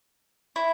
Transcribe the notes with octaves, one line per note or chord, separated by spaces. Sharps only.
E4